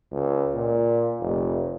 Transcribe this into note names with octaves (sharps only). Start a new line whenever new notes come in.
C#2
A#2
F1